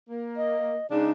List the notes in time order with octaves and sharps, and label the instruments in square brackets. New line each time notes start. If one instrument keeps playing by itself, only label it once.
[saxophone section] A#3
[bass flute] D#5
[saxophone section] C#3 G#3 D4 [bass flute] D#4